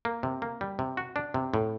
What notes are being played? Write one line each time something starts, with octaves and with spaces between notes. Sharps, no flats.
A#3
C3
A#3
G3
C3
F#4
D4
C3
A2